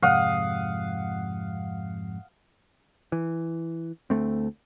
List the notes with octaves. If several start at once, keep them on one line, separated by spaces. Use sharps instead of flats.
F2 G#2 C3 F5 F#5 D#6
E3
D2 A3 C4